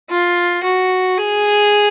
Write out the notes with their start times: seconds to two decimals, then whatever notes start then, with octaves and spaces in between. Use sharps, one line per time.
0.10 F4
0.63 F#4
1.18 G#4